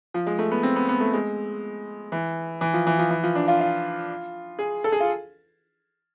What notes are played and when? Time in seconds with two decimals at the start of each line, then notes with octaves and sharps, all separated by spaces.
0.14 F3
0.27 G#3
0.39 A3
0.51 B3
0.63 C4
0.76 B3
0.89 B3
1.00 A3
1.13 G#3
2.12 E3
2.61 E3
2.74 F3
2.87 E3
2.99 F3
3.10 E3
3.23 F3
3.35 D4
3.48 F4
3.61 F4
4.59 G#4
4.84 A4
4.92 G#4
5.00 F4